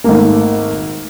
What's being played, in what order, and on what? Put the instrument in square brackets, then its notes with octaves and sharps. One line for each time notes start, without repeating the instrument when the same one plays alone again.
[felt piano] G#1 A3 A#3